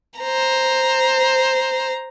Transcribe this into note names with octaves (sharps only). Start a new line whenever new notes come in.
C5 A#5